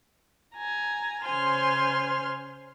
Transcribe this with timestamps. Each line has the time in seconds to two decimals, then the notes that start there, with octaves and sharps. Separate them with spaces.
0.55 G#5 A#5
1.23 C#3 C5 G#5 C6 F6